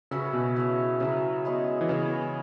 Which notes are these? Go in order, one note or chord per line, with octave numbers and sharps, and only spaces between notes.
C#3 C#4 F#4 B4 E5
B2
E4 C#5 E5
C#3 F#3 E4 B4
G#3 B3 G#4 C#5
E3
C#3 B3 G#4 C#5